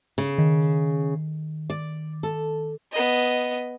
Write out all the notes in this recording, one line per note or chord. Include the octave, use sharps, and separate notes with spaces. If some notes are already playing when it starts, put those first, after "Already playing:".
C#3
D#3
D5
A4
B3 D#5